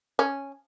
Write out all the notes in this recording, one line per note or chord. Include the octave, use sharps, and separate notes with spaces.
C#4